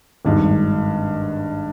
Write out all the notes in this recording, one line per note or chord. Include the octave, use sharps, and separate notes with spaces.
G#1 G2 D#3 G#3